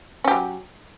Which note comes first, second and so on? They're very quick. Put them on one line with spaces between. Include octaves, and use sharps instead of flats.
C#4 G4 F#3